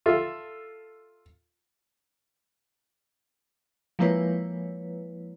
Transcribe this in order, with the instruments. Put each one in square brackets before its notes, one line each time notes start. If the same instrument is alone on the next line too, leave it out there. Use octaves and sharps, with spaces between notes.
[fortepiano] F4 A4 E5
[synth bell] F3 G#3 A#3 E4 B4 C#5